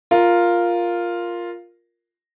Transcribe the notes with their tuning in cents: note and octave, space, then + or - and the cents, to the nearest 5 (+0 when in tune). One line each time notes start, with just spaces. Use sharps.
F4 +0 A#4 +0